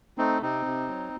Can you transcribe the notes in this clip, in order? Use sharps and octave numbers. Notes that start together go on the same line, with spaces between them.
A3 C4 D#4
C3 C4 D#4
C3
F#3